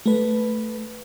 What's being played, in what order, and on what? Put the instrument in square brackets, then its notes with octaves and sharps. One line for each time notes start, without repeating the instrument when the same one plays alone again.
[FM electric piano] A3 B4